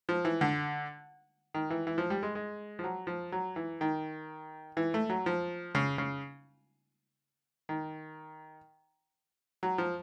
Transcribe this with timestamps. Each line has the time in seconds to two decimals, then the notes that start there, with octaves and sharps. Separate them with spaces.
0.09 F3
0.25 E3
0.41 D3
1.54 D#3
1.70 E3
1.87 E3
1.98 F3
2.10 G3
2.23 G#3
2.35 G#3
2.79 F3
2.84 F#3
3.07 F3
3.32 F#3
3.56 E3
3.81 D#3
4.77 E3
4.94 A3
5.10 F#3
5.26 F3
5.75 C#3
5.98 C#3
7.69 D#3
9.63 F#3
9.78 F3